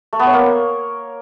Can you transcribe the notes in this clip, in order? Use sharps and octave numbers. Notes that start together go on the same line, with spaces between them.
A3
B3
C#5
A#3